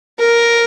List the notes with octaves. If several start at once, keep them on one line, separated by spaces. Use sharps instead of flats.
A#4